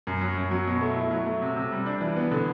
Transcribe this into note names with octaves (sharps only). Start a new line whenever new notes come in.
F#2
F#3
F#2
F#3
B2
A3
E4
F#3
A3
C3
C3
G3
D4
E3
B3
D3